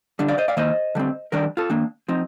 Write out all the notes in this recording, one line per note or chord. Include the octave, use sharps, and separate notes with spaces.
D3 G3 D4
D5 F5
C5 D#5
D5 F5
D#3 A#3 D#4 C5 D#5
D3 G3 C4
D#3 G3 D4 A#4 D5
F4 A4
D#3 A#3 D4
F3 C4 D#4